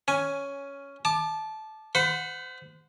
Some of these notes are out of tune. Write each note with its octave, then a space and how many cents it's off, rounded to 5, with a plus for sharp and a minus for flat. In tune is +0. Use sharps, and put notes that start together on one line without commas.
C#4 +5 G#5 +0
A5 -15 D6 +25
C5 -30 F#5 -20 B5 +25